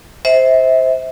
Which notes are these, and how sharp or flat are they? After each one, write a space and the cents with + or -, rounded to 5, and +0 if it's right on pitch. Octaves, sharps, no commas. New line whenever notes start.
C5 +0 E5 -30